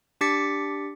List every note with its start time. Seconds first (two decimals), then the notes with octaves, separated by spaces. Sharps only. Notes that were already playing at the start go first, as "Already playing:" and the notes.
0.21 D4 G4 D6 A6 B6 C#7